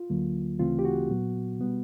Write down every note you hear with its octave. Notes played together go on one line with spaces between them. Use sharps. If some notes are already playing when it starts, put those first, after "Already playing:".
Already playing: F4
D2 D3 F#3 A#3
D2 C#3 E3 A3 C4 F4
G4
F#4
A#2 F#3 B3
B2 G3 B3